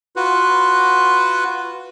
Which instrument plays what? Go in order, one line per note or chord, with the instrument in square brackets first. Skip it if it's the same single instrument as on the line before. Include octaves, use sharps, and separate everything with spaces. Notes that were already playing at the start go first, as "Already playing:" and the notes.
[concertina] F4 F#4 B4